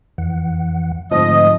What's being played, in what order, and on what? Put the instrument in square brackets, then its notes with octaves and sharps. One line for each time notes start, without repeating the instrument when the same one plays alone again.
[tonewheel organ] F2 E3 F#5
[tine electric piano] G#2 F3 [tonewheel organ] D3 A3 C4 [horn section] D#5